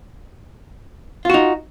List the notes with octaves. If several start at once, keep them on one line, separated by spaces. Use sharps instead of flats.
D#4 F4 F#4